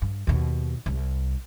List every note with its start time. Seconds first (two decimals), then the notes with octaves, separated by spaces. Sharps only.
0.02 G2
0.27 D#2 B2
0.86 C2